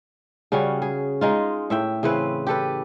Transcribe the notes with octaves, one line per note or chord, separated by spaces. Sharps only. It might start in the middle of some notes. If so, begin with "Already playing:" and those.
C#3 G3 C#4 F#4
G#4
G#3 D#4 F4
A2 E5 G5
C#3 E3 C4 B4
G4 A4 B4